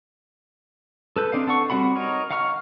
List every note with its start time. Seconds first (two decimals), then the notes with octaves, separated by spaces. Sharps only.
1.16 A4 B4 G6
1.32 C4 D4 D#4 F5
1.47 A4 F#5 C#6
1.70 G3 C4 F#4 F#5 B5
1.95 D#4 A#4 C#5
2.31 F5 F#5 A#5 C#6 F6